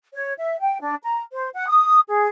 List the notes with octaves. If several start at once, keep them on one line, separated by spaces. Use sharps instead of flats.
C#5
E5
G5
D4
A#5
C5
F#5
D#6
G#4